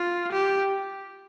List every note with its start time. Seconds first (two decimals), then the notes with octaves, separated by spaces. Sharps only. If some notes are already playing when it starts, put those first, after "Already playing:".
Already playing: F4
0.32 G4